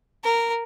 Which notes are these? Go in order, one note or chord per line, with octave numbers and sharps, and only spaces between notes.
A#4